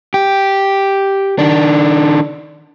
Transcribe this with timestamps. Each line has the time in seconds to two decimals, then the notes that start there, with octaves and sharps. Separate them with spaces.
0.14 G4
1.39 D#3 D4